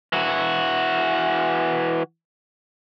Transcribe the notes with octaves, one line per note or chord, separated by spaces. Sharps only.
E3 F#4